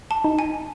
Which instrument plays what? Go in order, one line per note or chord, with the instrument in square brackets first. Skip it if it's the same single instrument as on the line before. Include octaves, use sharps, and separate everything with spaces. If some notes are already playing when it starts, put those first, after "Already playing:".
[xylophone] A5
[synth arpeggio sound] D#4
[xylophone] G#5